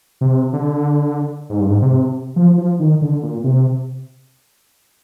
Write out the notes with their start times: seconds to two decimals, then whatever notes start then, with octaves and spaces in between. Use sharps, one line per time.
0.21 C3
0.53 D3
1.50 G#2
1.60 G2
1.70 G#2
1.82 C3
2.36 F3
2.58 F3
2.80 D#3
3.02 D3
3.23 A#2
3.44 C3